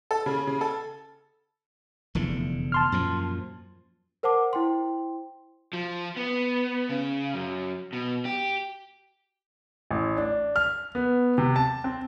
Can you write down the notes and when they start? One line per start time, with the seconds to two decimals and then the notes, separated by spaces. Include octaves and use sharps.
0.11 A4
0.26 C#3
0.47 C#3
0.61 A4
2.15 F1 E2 D3
2.72 A5 C6 F6
2.92 F#2 A#2 F3
4.23 A#4 C5 F#5 A5 D6
4.53 E4 C5 G5 C6
5.73 F3
6.16 B3
6.89 C#3
7.34 F#2
7.93 B2
8.25 G4
9.91 A1
10.17 D4
10.56 F6
10.95 B3
11.38 C3
11.56 A5
11.84 C4